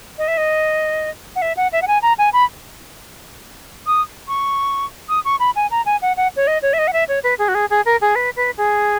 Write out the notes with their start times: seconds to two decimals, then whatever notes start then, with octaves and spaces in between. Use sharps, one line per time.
0.18 D#5
0.28 E5
0.37 D#5
1.36 F#5
1.42 E5
1.57 F#5
1.72 E5
1.82 F#5
1.87 G#5
2.02 A#5
2.18 G#5
2.33 B5
3.87 D#6
4.28 C#6
5.09 D#6
5.25 C#6
5.40 B5
5.56 G#5
5.71 A#5
5.86 G#5
6.02 F#5
6.17 F#5
6.36 C#5
6.47 D#5
6.62 C#5
6.73 E5
6.78 D#5
6.87 F#5
6.93 E5
7.08 C#5
7.24 B4
7.39 G#4
7.48 F#4
7.55 G#4
7.70 G#4
7.86 A#4
8.01 G#4
8.15 B4
8.36 B4
8.57 G#4